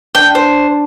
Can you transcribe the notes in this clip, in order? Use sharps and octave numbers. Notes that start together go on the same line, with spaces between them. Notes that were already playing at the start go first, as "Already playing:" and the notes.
D4 G5
C5